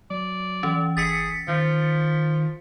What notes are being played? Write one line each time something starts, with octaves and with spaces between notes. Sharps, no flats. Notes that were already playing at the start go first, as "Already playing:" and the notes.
F#3 D5
E3 C#4
G1 G#4 A6 B6 C#7
D#3 F3